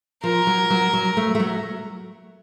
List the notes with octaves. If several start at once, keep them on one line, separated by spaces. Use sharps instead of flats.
F3 A#4
F#3
F#3
F#3
A3
A3
F#3